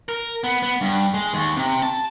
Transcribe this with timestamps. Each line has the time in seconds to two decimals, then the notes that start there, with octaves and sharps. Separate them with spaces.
0.09 A#4
0.44 B3
0.63 B3
0.81 G2
1.14 G#3
1.34 D#2
1.57 C3
1.82 A5